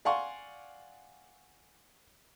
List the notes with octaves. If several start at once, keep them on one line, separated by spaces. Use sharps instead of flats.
D5 F5 F#5 G#5 C6 C#6